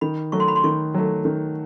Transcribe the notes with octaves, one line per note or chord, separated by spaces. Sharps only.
D#3 B5
F#3 A3 C#6
C6
B5
C6
D#3 C#6
F#3 A3
D#3